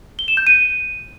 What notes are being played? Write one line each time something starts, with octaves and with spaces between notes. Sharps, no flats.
G7
E7
G6
D#7